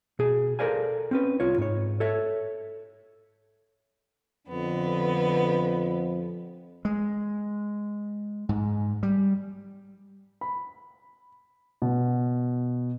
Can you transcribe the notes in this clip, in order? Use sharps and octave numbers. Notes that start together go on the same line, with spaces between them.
B2 G#4
A4 A#4 C5 D5 F5 G#5
C4 C#4 B4
C2 F4 C#5
G#2 C#5
A4 C#5 E5
F2 D3 B3
G#3
G#2
G3
B5
B2